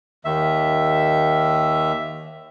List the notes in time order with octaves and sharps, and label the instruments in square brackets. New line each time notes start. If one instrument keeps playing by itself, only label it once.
[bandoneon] D#2 D#3 E5